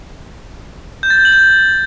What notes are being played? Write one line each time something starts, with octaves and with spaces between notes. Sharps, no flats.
G6
A6
G6
F#7
G6